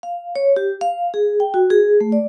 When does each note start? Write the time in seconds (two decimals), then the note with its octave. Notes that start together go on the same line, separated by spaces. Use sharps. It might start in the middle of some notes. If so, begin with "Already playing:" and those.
0.03 F5
0.36 C#5
0.56 G4
0.81 F5
1.14 G#4
1.40 G5
1.54 F#4
1.70 G#4
2.01 A3
2.12 D5